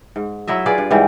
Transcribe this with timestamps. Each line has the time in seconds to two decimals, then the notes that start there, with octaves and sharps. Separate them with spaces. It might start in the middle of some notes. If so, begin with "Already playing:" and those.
0.16 G#2
0.47 F#3 E4 D#5 E5
0.66 F4 G#4 B4 D5
0.78 G2
0.91 G#2 E3 G3